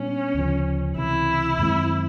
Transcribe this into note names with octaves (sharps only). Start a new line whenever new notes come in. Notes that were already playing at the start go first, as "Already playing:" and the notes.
Already playing: A#2 G3 B3 C#4 D4
D2 C#3 F3
C#2 C3 E3 E4
F#2 D#3 G#3 C4